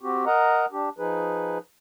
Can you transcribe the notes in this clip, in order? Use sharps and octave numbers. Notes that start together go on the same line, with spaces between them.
C4 F#4 G4
A#4 D#5 F#5 A#5
D4 G4
F3 D#4 G#4 B4